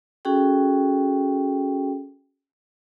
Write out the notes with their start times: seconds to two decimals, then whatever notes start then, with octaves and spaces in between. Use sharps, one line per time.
0.25 C#4 F#4 G#4 A4 G5